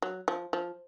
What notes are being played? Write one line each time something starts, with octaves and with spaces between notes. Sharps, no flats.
F#3
F3
F3